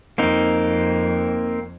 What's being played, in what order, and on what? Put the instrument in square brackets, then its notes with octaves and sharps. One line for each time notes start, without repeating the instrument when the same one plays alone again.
[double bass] F2 [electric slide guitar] A#3 C4 D#4